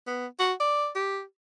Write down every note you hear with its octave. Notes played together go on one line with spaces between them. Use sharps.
B3
F#4
D5
G4